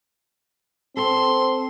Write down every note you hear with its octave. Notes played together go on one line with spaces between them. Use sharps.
C4 A4 C6